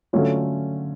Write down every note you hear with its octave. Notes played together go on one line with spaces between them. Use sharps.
D3 F#3 A3 C#4 F4